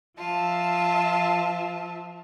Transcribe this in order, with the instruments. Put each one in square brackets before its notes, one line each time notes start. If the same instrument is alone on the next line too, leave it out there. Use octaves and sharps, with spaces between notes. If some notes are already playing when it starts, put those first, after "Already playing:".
[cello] F3 E5 [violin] F4 A5